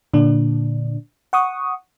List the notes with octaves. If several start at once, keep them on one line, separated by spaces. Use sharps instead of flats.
A#2 D3 D4
F#5 C#6 D#6